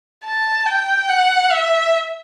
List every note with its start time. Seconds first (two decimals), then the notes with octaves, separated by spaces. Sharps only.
0.24 A5
0.66 G5
1.09 F#5
1.51 E5